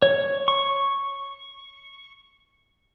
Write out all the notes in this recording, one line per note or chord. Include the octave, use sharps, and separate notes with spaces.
C#5
C#6